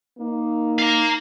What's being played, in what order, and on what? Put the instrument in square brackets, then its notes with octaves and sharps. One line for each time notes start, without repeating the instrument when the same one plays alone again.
[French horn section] A#3 D#4
[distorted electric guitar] F5 A#5